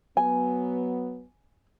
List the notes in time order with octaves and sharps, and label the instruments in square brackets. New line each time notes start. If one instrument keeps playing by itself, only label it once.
[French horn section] F#3 B3 [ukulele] G#5